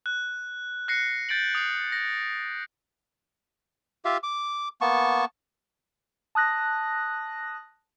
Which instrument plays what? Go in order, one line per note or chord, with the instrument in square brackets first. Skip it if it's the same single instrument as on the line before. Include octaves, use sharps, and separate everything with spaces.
[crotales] F#6
F#6 A#6 C7 C#7
G6 A6 D7 F#7
D#6 C7
A#6
[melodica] F4 G4 E5 F5
D6
A#3 B3 A5 C#6
[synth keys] A5 D#6 F#6 A#6